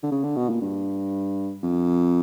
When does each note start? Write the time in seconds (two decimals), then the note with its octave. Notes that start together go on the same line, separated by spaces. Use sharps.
0.03 D3
0.12 C#3
0.24 D3
0.36 B2
0.50 A#2
0.62 G2
1.63 F2